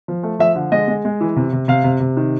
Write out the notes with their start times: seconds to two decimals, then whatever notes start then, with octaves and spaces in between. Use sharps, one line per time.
0.08 F3
0.23 A3
0.39 F3 E5
0.56 D3
0.72 G#3 D#5
0.88 G#3
1.05 G#3
1.20 E3
1.36 C3
1.53 C3
1.68 C3 F5
1.84 C3
2.00 C3
2.17 D#3